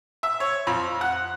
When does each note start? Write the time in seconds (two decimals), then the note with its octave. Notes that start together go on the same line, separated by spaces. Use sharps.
0.23 E5
0.40 C#5
0.67 F2
1.01 F#5